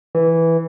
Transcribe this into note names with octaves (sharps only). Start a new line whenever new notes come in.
E3